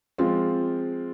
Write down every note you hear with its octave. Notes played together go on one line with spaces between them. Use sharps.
F3 G#3 C4 F4